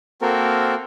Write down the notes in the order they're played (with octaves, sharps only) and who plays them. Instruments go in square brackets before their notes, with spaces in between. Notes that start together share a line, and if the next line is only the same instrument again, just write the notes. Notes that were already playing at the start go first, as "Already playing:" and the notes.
[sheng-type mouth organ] A#3 C4 F#4 A4 A#4